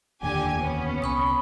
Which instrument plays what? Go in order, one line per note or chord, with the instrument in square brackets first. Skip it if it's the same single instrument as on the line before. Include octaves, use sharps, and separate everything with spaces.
[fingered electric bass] F1 D#2 A#2 [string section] D3 G4 G#5
[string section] B3 C#4
[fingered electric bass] C2 [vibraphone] B5 C#6 D#6